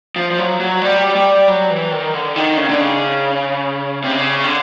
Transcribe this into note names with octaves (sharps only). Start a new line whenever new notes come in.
F3
F3
F#3
F#3
G3
G3
F#3
E3
D#3
D3
D#3
C#3
D3
C#3
C3
C#3
D3